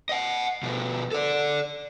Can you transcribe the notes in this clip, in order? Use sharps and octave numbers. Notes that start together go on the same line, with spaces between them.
D#5 F#5
B2 F3
A4 D5